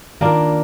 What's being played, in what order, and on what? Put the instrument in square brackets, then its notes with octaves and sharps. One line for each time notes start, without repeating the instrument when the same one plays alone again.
[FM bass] D#3 [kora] A#3 D4 F4 A#4